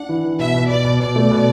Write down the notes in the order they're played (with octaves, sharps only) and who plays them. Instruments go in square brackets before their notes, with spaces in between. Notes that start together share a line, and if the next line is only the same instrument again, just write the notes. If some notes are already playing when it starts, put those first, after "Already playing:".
Already playing: [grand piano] D4 [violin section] F#5
[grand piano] E3
E3
[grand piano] B2 [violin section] E5
[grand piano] B2
[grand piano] B2 [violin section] D5
[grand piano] B2
[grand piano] B2 [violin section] D5
[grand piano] A3
B2